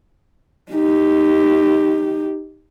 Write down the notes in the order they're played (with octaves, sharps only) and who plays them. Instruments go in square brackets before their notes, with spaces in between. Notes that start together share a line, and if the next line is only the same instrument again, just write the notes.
[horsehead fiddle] D#4 G4